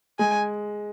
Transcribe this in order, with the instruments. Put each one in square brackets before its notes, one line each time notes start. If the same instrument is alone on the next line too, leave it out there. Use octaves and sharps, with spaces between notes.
[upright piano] G#3 [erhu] G#5